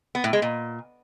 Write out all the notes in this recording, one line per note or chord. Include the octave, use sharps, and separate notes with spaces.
B3
A2
G#3
A#2